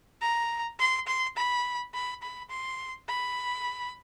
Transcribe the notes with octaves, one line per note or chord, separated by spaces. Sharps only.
A#5
C6
C6
B5
B5
B5
C6
B5